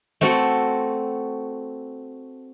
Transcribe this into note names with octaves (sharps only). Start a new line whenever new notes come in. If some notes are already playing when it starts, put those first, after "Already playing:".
A3 C4 F#4 A4